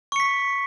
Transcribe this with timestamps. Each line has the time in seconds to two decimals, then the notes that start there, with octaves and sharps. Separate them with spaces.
0.12 C#6
0.16 C#7
0.20 B6